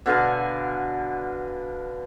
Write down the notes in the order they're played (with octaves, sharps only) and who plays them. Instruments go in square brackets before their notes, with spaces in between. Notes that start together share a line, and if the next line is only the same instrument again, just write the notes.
[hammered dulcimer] B2 D3 F5 G#5